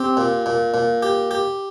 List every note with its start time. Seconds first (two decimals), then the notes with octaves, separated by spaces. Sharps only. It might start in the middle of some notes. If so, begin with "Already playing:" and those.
Already playing: C4 G4
0.17 A#2
0.46 A#2
0.74 A#2
1.02 G4
1.31 G4